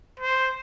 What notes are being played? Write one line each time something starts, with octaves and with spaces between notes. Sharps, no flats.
C5